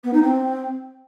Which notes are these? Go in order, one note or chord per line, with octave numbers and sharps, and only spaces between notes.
B3
D#4
C4